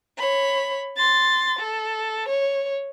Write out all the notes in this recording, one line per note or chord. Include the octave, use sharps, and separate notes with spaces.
C#5 B5
C6 A6
A4
C#5